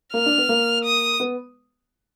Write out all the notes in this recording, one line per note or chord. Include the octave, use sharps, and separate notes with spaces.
A#3 F6
D4
B3
A#3
D#6
B3